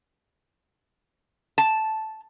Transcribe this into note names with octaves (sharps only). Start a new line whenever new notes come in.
A5